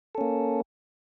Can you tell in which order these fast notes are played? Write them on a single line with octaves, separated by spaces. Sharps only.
A4 C#4 A#3